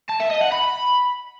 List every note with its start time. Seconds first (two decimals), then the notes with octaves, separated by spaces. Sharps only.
0.09 A5
0.20 E5
0.30 D#5
0.41 F#5
0.52 B5